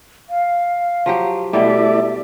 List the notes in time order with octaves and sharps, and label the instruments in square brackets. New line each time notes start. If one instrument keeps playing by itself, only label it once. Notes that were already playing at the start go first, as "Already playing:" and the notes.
[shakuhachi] F5
[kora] F3 F#3 G4
[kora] B2 G3 [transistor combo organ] A3 E4 D5 [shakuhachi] E5